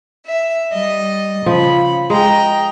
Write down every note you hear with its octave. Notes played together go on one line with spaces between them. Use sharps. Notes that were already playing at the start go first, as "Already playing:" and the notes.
E5
G3 D#5
C#3 F3 B5
G#3 D#5 G5 A#5